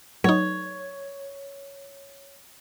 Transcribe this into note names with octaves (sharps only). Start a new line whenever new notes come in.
F#3 D#4 C#5